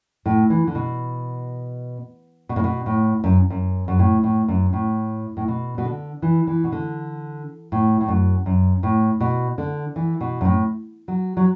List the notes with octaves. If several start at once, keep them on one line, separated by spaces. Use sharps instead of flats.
A2
E3
D3
B2
B2
A2
B2
A2
F#2
F#2
F#2
A2
A2
F#2
A2
A2
B2
B2
D3
E3
E3
B2
D3
A2
A2
F#2
F#2
A2
B2
D3
E3
B2
F#2
A2
F#3
F#3